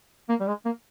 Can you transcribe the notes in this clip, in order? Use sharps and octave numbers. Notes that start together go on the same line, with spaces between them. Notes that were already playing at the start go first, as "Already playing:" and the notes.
A#3
G3
G#3
A#3